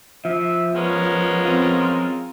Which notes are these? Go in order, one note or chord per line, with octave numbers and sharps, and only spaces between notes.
F3 E5
G#3 B3 C#4 A#4
C4 F4